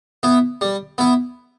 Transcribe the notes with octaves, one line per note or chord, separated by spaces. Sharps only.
B3 E4
G3
B3 E4